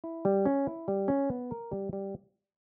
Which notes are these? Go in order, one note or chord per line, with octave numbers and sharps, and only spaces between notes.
E4
G3
C#4
E4
G3
C#4
B3
A#4
G3
G3